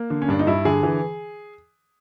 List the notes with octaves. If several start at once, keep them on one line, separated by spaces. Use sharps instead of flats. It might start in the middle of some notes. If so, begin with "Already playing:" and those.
Already playing: A#3
D3
C#4
G2 D4
D#4
G2 E4
D3 G#4
E3